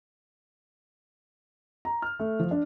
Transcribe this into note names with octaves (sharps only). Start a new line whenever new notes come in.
A#5
F6
A3
F3
D4